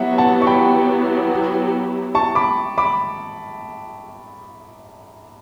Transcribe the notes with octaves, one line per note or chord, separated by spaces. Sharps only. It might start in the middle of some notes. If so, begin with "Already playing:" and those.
Already playing: F#3 B3 E4 G4 E5 F#5
F#5 A5
C#6
G5 B5
A5 C#6
B5 D6
B5 D6